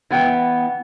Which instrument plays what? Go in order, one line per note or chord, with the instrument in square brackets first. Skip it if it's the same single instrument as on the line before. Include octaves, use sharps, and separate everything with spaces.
[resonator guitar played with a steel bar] E3 B3 G5